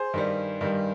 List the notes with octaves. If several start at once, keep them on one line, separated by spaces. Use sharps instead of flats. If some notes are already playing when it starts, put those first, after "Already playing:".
Already playing: G#4 C5
G2 D#3 G3
G2 D#3 G3